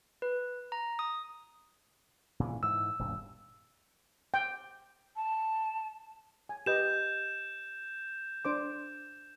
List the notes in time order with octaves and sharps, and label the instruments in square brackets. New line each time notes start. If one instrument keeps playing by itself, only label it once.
[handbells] B4
A#5
D#6
[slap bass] A#2 C#3 E3
[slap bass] G#2 E3 [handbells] E6
[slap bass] D#1 G2 B2
[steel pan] G5
[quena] A5
[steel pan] G#5
[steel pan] G4 B4 D#5 [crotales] G6 E7
[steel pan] D4 C5 D6